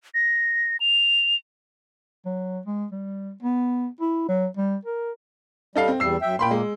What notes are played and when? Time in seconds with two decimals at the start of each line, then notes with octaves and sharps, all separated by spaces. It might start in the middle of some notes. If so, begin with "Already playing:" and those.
0.15 A#6
0.80 F7
2.26 F#3
2.66 G#3
2.92 G3
3.43 B3
4.01 E4
4.28 F#3
4.57 G3
4.85 A#4
5.75 G3 D#4 A4 F5
5.88 C4
6.00 E2 G3 E6 C7
6.22 F#2 E5 G5
6.39 A#2 A#3 G5 B5 C6
6.51 G#3